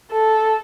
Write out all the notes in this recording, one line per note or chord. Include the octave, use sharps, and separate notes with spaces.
A4